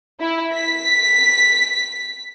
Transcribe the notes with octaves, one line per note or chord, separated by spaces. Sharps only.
E4
B6